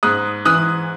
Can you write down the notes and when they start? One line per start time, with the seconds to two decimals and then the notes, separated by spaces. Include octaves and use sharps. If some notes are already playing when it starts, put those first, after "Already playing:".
0.03 G#2 D#6 F#6
0.45 E3 D#6 F#6